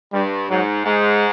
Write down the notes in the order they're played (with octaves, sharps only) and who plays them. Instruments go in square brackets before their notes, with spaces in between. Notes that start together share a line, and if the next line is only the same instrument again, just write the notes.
[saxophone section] G2 [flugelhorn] G3
[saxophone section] G#2 [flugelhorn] F#3
[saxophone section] G#2 [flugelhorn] G#3